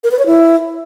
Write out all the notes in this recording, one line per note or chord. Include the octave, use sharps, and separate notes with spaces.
A#4
B4
C#5
E4